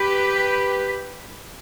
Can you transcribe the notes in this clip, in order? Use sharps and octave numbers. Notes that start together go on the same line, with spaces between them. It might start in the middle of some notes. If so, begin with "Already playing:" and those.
Already playing: G4 B4